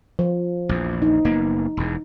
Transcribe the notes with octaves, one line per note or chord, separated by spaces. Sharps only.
F3
A#1 E2
D#4
F#1 A#3 B3
E1 E2